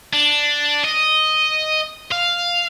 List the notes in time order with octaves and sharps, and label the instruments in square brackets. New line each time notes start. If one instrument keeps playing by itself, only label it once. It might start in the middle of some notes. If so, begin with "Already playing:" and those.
[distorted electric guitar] D4
D#5
F5